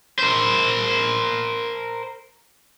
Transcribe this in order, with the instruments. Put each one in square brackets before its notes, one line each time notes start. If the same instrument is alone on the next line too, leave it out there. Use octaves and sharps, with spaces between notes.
[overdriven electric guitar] A#4 C5